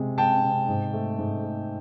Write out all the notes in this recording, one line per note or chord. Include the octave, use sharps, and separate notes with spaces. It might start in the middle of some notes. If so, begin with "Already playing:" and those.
Already playing: C3 G#3
G#3 G5 A5
C3
G#2
A3
G#2
A3